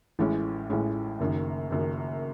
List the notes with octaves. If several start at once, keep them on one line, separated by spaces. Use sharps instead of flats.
A1 A2 E3 G#3 C#4
A1 A2 E3 G#3 C#4
F#1 F#2 D#3
F#1 F#2 D#3